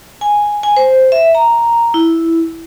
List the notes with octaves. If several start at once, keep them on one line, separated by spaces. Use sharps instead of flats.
G#5
G#5
C5
E5
A#5
E4